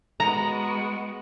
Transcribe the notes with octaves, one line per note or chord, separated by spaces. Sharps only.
G#3 B3 F#4 A#5